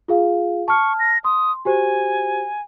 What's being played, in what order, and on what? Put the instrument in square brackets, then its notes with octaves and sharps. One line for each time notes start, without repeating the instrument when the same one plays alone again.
[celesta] F4 G#4 F5
[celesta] A5 F6 [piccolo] C#6
[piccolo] A#6
[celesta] C6 [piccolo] D#6
[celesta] F#4 G4 C5 [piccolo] G#5